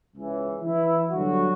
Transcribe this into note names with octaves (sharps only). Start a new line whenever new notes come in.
C#2 C#3 E3
E3 E4
G1 G2 D3 F#3 F#4